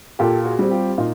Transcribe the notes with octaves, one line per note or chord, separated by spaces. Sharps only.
A#2 G4 A4
F#4 G#4
G3 C4
F4 G4
A#2 D#4 F4